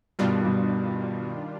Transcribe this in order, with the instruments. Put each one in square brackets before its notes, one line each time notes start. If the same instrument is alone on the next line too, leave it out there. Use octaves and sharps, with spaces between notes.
[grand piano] G2 B2 [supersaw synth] D#3 G3 D4 F4
[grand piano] G2 B2